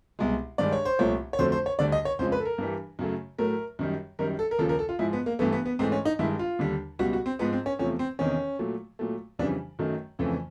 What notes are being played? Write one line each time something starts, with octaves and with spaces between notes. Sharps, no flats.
C2 B2 G#3
G2 D#3 G#3 D5
C#5
C5
C2 A#2 F3 A3 C#5
C#5
F2 D3 F#3 A3 C5
C5
C#5
D2 D3 G3 D5
D#5
C#5
F2 C#3 F3 G#3 C5
B4
A4
A#4
G2 E3 G3
F#2 C#3 F#3 A3
A2 F#3 A3 A#4
F#2 D#3 G3
F#2 D#3 G3 A#4
A4
A#4
D#2 C#3 F3 A4
A#4
A4
F4
G#2 F3 G#3 E4
B3
A#3
G2 E3 A3 B3
B3
B3
G#2 E3 A3 C4
C#4
D#4
G2 D#3 G#3 E4
F4
D#2 D3 G3
C#2 B2 G3 F#4
F#4
C4
G#2 F3 G#3 B3
C4
C#4
E2 C3 F3 A3 C#4
C4
E2 C3 D#3 C#4
A#2 F#3 A3
A#2 F#3 A3
F2 C#3 E3 G3 D4
F#2 D#3 F#3 A3
F2 C#3 E3 A3